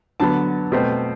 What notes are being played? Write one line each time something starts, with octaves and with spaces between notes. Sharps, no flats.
D3 F#3 B3 A5
B2 A3 C4